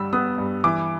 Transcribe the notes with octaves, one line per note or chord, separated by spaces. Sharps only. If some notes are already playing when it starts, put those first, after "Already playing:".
Already playing: G2 G3 E6
B3 D#6
G2
E3 D6